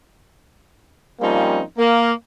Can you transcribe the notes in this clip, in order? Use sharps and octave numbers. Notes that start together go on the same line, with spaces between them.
F3 G3 A#3 C4 C#4 D#4
A#3